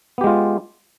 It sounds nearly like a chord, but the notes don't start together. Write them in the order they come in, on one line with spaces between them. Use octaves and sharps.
B3 G4 G#3 F4